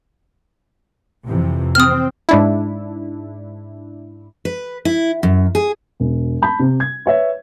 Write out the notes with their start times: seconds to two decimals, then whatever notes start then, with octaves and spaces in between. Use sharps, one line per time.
1.26 F2 C3 E3
1.75 C4 D#6 F6
2.29 G#2 D4 E4
4.45 B4
4.85 E4
5.23 F#2
5.55 G#4
6.00 E1
6.42 A5 B5 G6
6.59 C3
6.80 G#6
7.06 B4 C#5 E5